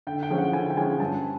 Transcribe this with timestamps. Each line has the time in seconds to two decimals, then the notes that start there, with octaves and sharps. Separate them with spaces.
0.07 D3 G5
0.23 G5
0.30 F3 G#3 C#4
0.38 F#5
0.53 D3 G#5
0.70 G5
0.77 F3 G#3 C#4 G#5
1.00 G2 A5